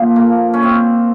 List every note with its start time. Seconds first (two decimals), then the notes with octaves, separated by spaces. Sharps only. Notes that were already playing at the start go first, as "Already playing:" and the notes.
Already playing: A#2 F3
0.16 A#3
0.54 C#4
0.63 C4